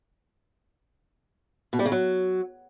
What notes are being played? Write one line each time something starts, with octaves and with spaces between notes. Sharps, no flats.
B2
G3
C#3
F#3